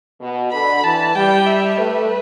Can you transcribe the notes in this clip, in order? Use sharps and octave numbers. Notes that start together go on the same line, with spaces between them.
B2
D3 B5
E3 A5
G3 G5
E5
A3 B4